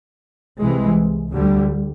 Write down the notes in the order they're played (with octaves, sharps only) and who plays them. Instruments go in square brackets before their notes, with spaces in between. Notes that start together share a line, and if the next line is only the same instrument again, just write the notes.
[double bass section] C2 C3 E3 G#3
D2 D3 G3